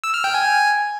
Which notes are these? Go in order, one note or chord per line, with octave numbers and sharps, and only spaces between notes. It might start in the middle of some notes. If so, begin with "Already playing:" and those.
E6
F6
G5
G#5
G#5